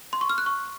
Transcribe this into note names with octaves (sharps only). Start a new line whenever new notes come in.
C6
C#6
F6
F#6
C#6